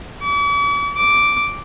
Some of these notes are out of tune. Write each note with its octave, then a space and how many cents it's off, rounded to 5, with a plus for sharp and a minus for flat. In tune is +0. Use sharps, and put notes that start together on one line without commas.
D6 -45
D6 -5